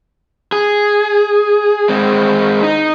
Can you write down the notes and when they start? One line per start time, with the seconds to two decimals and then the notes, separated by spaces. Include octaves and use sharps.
0.52 G#4
1.89 G#3 C4
2.63 D#4